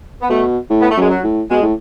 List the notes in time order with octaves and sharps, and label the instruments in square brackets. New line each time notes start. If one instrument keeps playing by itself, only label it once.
[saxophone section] B3
[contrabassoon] B2 [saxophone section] A3
[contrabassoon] A2
[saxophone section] B3
A3
[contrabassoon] F#2 [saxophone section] G#3
[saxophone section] F#3
[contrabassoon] A2
[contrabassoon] B2 [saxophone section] G#3
[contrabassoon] A2